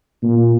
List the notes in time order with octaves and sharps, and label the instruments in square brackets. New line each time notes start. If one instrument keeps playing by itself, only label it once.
[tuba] A#2